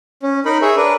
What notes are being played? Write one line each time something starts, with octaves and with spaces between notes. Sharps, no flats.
C#4
D#4 A#4 B5
G#4 C#5 E5
D4 A#4 B4